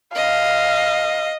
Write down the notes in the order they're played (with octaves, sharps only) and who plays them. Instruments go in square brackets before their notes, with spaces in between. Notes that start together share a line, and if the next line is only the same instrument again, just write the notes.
[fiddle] D#5 [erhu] F5